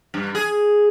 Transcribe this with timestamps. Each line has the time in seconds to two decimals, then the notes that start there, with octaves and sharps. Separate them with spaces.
0.14 G2
0.35 G#4